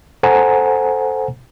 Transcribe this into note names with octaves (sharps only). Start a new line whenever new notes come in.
A4 C5 F#5 G#5 A#5